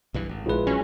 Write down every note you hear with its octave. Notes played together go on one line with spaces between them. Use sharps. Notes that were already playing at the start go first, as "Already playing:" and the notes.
B1 G2 E3
G#1
A#1 G#3 E4 F4 B4
F#3 C#4